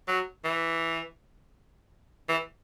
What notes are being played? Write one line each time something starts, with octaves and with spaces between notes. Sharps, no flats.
F#3
E3
E3